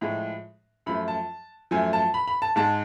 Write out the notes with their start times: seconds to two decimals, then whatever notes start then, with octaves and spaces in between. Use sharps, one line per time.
0.01 A2 F3 G#3
0.86 F#2 F3 A3 B5
1.08 A5
1.71 F#2 F3 A3 G#5
1.93 A5
2.14 B5
2.27 B5
2.42 A5
2.56 G#2 G#3 A5